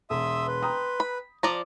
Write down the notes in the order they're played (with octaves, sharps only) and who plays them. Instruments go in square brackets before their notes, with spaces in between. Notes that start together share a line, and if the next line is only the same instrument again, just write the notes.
[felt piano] E1 [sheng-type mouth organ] E5 D#6 E6 [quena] C6
[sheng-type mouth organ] B4
[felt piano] G5 A#5 D#6
[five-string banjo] B5
[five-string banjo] F3 D5 A#5 [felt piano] D6